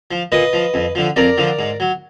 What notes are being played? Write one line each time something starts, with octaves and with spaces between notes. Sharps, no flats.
F3
A#2 B4 D#5
F3
F2
D3 F3
F2 A#4 D5
D3 F3
G#2
F#3